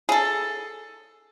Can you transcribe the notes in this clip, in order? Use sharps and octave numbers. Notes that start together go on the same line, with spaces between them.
G#4 A4